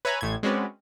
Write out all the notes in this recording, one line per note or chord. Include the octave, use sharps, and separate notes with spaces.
B4 C#5 E5 G#5 A#5 B5
A1 A2 G#6
G#3 C4 C#4 F#4 B4 D5